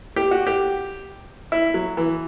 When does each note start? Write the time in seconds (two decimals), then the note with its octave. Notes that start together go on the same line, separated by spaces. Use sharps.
0.16 G4
0.31 F#4
0.47 G4
1.52 E4
1.74 F#3
1.97 E3